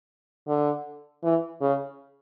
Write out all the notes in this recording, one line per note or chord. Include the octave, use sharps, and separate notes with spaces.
D3
E3
C#3